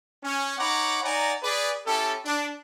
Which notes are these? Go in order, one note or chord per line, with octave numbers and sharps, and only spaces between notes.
C#4
D#4 C#5 F#5 A#5 B5 D6
D#4 D5 F#5 G#5 A#5
G#4 B4 D5
C#4 E4 G4 A4
D4